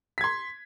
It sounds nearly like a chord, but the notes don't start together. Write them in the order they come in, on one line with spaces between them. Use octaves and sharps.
B6 G#6 C6